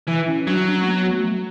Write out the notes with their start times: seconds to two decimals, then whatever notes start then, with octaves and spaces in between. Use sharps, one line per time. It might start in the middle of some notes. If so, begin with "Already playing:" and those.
0.07 E3
0.27 C#4
0.47 F#3 D4
0.66 C#4
0.81 A3
0.86 B3
1.12 A3
1.30 F#3